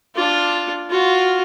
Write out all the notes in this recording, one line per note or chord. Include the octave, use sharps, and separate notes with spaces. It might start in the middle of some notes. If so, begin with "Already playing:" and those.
D4 F4
F4 F#4